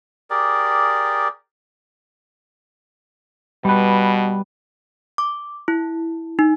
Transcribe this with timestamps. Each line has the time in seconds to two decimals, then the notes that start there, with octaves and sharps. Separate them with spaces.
0.30 G4 G#4 A#4 D5
3.65 B2 G3 B4
5.18 D6
5.68 E4
6.39 D#4